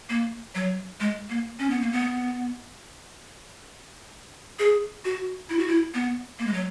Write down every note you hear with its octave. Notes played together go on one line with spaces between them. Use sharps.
A#3
F#3
G#3
A#3
C#4
B3
A#3
B3
G#4
F#4
E4
F#4
E4
B3
A#3
G#3
F#3